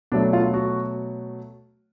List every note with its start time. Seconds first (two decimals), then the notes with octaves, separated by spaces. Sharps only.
0.12 B2 F#3 A3 D4
0.33 F4
0.54 F#4